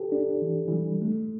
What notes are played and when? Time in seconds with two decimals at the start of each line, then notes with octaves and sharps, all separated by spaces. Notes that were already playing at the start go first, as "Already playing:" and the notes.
Already playing: G4 A4
0.12 D4
0.42 E3
0.68 E3
0.73 G3
1.02 A3